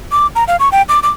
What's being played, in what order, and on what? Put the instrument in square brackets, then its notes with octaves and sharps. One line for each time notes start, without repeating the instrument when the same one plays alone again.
[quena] D6
A#5
F5
C#6
G5
D6
D6